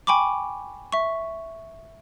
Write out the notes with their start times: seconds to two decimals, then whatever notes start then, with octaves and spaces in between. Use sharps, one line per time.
0.07 G5 G#5 B5 C#6 D6
0.92 E5 C#6